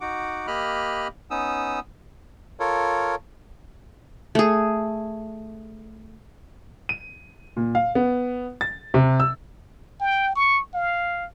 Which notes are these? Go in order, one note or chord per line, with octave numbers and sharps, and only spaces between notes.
D#4 F#4 F#5 D6
A#3 G4 D#5 B5 F6 F#6
B3 C#4 D#4 D#6 E6
F4 A4 A#4 C#5
A3 G#4
D#7
A#2
F5
B3
A6
C3
E6
G5
C#6
F5